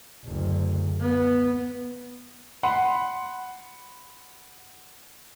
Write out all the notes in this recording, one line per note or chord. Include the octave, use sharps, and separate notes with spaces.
F#1 D2
B3
F#5 B5 C6